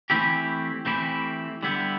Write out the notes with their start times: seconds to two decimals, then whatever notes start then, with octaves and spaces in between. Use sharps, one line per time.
0.10 E3 A3 C4 E4 G4
0.85 E3 A3 C4 E4 G4
1.63 D3 G3 B3 E4 G4